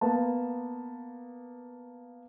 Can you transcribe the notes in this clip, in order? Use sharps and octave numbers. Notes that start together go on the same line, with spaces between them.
A#3 B3 A5